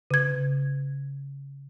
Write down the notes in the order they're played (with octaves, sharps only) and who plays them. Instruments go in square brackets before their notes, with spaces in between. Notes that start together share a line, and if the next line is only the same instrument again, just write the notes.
[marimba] C#3 G#6